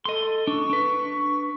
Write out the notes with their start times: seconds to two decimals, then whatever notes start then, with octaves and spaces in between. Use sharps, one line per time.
0.05 A4 D#5 C6
0.47 D4 C#6
0.70 D4 B4